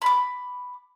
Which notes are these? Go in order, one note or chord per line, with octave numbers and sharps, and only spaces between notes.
B5 D6